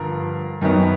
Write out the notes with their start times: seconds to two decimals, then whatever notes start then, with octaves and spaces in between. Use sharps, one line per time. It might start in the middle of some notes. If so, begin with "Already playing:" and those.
Already playing: G2 D3 F3 A#4
0.61 F#2 D#3 F#3 B3